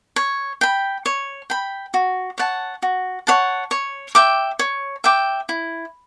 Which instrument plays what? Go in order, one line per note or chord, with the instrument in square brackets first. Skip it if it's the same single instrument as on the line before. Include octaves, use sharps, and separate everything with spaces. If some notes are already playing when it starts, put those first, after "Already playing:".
[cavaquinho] C#5
G5 B5
C#5
G5 B5
F#4
C#5 F#5 A5
F#4
C#5 F#5 A5
C#5
E5 G5 D6
C#5
E5 G5 D6
E4